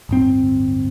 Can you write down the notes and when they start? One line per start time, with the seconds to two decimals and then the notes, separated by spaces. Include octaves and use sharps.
0.09 D1 G1 C4